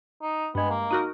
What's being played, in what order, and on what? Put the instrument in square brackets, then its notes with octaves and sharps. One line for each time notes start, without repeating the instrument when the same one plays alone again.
[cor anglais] D#4
[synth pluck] G2 G#3 [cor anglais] B3
[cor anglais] A#3
[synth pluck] D#4 F#4 A#4